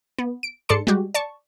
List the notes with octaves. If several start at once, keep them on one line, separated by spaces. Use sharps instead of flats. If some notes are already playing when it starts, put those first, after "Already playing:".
B3
D7
G#2 A4 D5 A5 C6 C#7
G3 G#3 F#4 G4
D5 A5 C#6